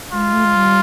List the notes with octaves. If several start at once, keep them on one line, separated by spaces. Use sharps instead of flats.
G#3 F4
A3
G#3
G3